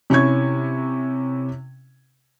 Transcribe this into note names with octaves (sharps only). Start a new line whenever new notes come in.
C3 C#4 E4 C#6 G#6